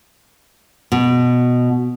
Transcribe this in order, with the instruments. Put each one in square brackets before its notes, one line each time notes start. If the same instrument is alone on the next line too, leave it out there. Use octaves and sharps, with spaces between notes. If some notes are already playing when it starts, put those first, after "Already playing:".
[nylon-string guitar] B2